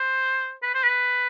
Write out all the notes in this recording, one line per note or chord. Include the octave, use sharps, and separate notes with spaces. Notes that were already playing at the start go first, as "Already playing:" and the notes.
Already playing: C5
B4
C5
B4